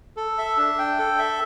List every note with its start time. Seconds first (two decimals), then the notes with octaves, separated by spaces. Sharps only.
0.17 A4
0.38 E5
0.57 D4
0.79 G5
0.98 A4
1.18 E5